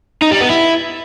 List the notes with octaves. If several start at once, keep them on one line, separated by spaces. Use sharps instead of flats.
D#4
G3
B3
E4